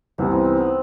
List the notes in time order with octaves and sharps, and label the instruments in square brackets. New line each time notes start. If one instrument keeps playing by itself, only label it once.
[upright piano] C2 C3 E3 B3 [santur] C4
[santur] D#4
C4
B3
C4